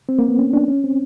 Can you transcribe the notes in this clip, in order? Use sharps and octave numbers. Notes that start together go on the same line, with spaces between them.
C4
A#3
B3
C#4
D4
C#4
C4